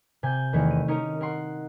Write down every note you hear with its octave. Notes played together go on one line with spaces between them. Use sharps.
C3 G#5 G6
E2 D#3 A3
D#7
C#4 D#4 A#4 C#5
A#4 F#5 C6